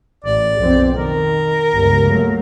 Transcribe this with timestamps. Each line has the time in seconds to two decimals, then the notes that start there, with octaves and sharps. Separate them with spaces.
0.24 A1 D5
0.58 B1 F2 C4
0.94 D#3 A#4
1.74 G1 C#2
2.06 F#3 A3 A#3